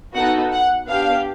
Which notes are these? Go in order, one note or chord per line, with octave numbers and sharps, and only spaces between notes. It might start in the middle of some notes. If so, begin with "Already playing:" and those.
B3 D#4 F#4 A4 F#5
F#5
B3 D4 G4 F5